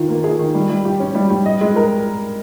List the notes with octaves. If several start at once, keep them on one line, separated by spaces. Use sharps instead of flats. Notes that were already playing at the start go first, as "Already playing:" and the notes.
Already playing: D#3 F4
A#3
G#4
D#3
G3
G3
G4
C#4
G3
G3
D#5
G#3
A#4